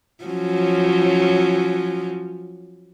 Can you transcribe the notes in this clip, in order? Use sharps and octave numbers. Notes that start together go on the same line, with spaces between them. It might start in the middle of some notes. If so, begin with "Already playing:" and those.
F3 F#3 C#4